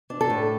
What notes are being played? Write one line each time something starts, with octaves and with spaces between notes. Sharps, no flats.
D4
A4
A2